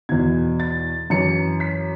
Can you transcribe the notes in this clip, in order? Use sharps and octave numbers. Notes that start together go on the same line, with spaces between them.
E2 B2 G#6
A6
F#2 E3 C#7
B6